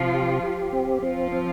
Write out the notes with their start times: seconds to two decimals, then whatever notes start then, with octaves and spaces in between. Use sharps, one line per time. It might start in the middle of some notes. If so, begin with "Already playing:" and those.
Already playing: C3 F3 F4
0.14 G4
0.43 G4
0.73 C4
1.02 F3 C4 F4
1.32 C4